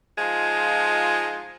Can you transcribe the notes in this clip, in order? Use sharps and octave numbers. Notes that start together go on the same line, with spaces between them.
F3 G#3 D#4 F4